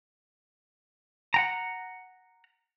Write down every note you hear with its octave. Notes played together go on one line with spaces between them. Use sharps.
F#5 G5 A#5